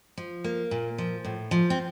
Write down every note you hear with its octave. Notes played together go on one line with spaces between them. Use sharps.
F3
A#3
A#2
F3
A2
F3
C4